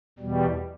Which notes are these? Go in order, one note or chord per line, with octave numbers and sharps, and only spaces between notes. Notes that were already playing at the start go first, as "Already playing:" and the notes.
E2 B2 G3